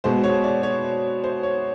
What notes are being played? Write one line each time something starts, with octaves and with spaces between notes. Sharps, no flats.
B2 G#3 B3 C5
C#5
D5
C#5
C5
C#5